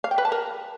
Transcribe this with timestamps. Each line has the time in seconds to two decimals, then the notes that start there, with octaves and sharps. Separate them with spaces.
0.04 F5
0.11 G5
0.18 B4
0.25 A5
0.32 A#4